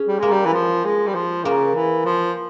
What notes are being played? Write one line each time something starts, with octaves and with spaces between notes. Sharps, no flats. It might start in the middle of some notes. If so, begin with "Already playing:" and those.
Already playing: C#4 G#4
G3
G#3 A#3
G3
E3
F3
G#3
G3
F3
C#3 A#3
E3
F3